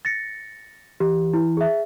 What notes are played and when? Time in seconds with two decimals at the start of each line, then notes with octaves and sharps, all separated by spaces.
0.05 A6 A#6 C#7
1.00 E3 G4
1.34 E4
1.57 G#4 E5